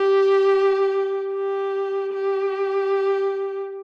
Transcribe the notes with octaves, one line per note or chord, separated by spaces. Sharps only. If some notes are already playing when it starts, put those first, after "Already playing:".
Already playing: G4
G4
G4